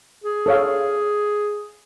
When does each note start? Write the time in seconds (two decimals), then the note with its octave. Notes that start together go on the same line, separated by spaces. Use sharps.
0.24 G#4
0.46 A4 C#5 F5